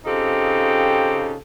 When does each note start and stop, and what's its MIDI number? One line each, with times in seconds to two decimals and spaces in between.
0.05 1.35 49
0.05 1.35 60
0.05 1.35 63
0.05 1.35 65
0.05 1.35 67
0.05 1.35 69